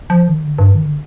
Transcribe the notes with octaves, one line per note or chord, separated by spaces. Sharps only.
F3
D#3
D3
G2
D#3
D3